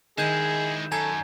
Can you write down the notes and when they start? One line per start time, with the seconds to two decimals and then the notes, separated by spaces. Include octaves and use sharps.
0.18 D#3 G#3 E4 G#4 C5 G6 E7
0.92 F#2 A4 G#5 A#5 G#6